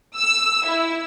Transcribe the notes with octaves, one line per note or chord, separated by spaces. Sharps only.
E6
E4